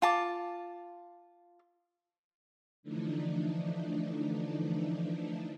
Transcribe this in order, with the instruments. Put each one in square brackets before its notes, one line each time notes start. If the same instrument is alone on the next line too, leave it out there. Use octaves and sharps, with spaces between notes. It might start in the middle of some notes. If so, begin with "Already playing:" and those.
[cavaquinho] F4 A5 D6
[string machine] D3 E3 F3 A3 D4 D#4